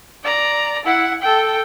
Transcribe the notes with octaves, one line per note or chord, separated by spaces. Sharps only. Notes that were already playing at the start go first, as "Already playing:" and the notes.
D5 A#5
E4 F#5
A4 G5